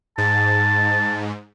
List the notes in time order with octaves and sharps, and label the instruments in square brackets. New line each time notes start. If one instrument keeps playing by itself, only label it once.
[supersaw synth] G#2 [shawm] A5